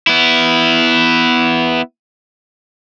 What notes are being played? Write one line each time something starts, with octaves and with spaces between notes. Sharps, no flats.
B3 E4